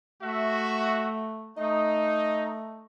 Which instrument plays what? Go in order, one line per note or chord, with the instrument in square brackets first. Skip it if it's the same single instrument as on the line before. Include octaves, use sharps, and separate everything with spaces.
[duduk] A3 [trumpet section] F#4 E5
[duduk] A3 [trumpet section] D#4 [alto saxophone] D#5